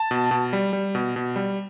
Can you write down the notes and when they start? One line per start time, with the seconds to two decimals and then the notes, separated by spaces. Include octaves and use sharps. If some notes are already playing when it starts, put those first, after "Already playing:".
Already playing: A5
0.11 B2
0.31 B2
0.53 G3
0.73 G3
0.95 B2
1.16 B2
1.36 G3